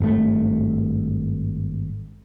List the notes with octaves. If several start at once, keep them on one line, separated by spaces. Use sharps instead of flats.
G#1 G2 C3 A3